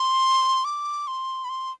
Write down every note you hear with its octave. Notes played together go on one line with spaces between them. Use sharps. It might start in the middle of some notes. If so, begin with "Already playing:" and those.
Already playing: C6
D6
C6
B5
C6